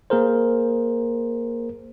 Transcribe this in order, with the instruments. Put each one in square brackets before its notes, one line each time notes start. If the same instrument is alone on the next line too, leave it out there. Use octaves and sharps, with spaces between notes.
[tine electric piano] A#3 G#4 A#4 C5